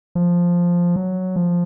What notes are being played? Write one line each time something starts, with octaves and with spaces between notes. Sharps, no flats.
F3
F#3
F3